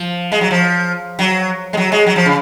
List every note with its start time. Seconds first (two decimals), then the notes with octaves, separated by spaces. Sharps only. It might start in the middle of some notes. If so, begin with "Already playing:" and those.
Already playing: F3
0.32 G#3
0.41 F#3
0.51 F3
1.19 F#3
1.73 G#3
1.77 F#3
1.92 G#3
2.06 F#3
2.16 F3
2.26 C#3